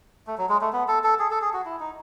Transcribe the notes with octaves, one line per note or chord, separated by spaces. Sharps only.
A3
F#3
G#3
A3
B3
A4
A4
G#4
A4
G#4
F#4
E4
D#4